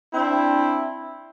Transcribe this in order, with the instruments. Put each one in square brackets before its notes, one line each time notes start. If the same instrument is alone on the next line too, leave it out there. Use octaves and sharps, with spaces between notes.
[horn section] C4 D4 E4